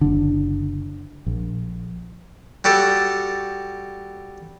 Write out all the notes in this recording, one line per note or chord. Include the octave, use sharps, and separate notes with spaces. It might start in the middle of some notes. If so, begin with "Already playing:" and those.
F#1 D3
A#1
G3 F#4 G4 A4